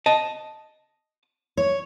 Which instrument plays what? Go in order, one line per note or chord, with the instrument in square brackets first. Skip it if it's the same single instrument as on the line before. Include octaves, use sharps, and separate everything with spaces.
[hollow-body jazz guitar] D#5 A5
[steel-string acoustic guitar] C#5